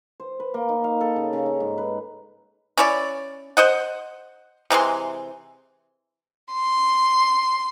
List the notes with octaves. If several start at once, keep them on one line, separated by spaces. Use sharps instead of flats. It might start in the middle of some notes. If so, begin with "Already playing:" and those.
C5
B4
A#3
D#4
F5
A4
C#3
C#3
D#4
G#2
B4
C#4 E4 C#5 D5
C5 D#5 F#5
C3 E3 G#3 C6
C6